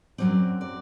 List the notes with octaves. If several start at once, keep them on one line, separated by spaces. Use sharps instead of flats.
F#2 D3 F#3 C4 D5
D5